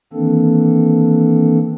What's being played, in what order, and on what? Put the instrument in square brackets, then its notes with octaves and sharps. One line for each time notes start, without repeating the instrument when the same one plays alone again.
[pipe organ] D#3 E3 A#3 C4 D4 A4